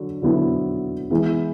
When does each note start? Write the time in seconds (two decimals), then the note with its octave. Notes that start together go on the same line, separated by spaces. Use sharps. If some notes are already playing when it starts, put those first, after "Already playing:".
Already playing: D3 F#3
0.22 D3 F#3 B3 E4
1.10 E3 G#3 B3 E4